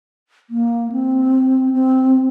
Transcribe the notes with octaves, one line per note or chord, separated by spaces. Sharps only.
A#3
C4
C4